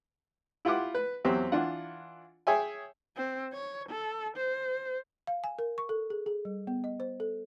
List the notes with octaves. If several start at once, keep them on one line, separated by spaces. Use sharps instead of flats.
E4 F4 G4 F#5 D6
B4
E2 F#3 C4 G4 C5
E3 D4 F4 F#5
G#4 C#5 E5 G5 G#5
C4
C#5
A4
C5
F5
G#5
A#4
C#6
A4
G#4
G#4
G3
B3
D#5
C5
A4